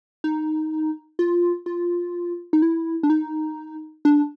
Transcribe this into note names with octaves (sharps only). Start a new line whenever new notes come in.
D#4
F4
F4
D#4
E4
D4
D#4
D4